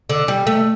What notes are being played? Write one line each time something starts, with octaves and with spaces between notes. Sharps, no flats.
D3
G3
A3